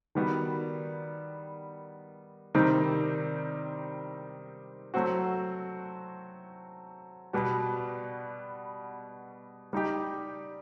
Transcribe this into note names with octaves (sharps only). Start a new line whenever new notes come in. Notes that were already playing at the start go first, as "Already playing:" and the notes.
D#3 G3 B3 F#4
C3 D#3 G3 C4 D#4
F#3 A3 C4 F#4
B2 G3 B3 F#4
G3 D#4 G4